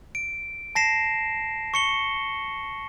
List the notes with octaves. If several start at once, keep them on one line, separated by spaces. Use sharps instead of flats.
D7
A5 A#6 C7 E7
C#6 C#7 G7